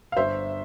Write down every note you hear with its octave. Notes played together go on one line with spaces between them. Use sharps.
F5
G1 C5 E5